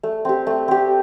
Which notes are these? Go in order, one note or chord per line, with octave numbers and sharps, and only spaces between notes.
A3
C4 G4
A3
C4 G4